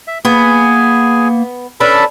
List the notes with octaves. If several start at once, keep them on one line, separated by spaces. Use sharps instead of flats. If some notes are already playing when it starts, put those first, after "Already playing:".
E5
A#3 B3 G#4 G#5
C#4 D4 A4 B4 A5 B5